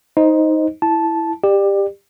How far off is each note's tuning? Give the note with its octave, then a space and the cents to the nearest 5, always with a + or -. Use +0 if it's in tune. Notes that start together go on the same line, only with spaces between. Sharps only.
D#4 +15 C5 +0 D#5 +0
E4 +0 A5 -10
G4 +15 D5 +25